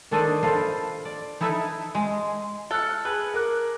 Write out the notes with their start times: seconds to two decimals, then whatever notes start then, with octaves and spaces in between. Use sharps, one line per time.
0.11 D#3 D4 A4 C5 D5 D#5
0.43 F4 A4 B4 C5
1.05 D5
1.41 D#4 E4 A4 B4 E5
1.95 G#3
2.71 A4 F6 F#6 C#7
3.05 G#4 B4
3.34 A#4 D6 F#6